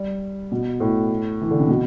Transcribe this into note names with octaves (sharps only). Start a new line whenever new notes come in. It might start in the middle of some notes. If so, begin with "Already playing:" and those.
Already playing: G3
B2
A2
E3
D3
C3
B2